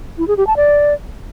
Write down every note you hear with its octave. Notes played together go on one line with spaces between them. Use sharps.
E4
G#4
G4
A5
D5